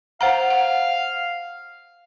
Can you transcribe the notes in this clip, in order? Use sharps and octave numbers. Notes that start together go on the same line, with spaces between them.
C5 F5 F#5 A#5
F#5